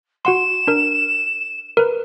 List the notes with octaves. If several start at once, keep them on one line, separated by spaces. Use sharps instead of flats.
F#4 F#5 C6 E7
D4 A#4
A#4 B4